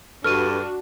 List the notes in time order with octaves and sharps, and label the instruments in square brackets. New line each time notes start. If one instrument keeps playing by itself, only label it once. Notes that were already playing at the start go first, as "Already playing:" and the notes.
[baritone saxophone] G2 [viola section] D4 F#4 [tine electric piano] A4 B4 C#6 [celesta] F6 D#7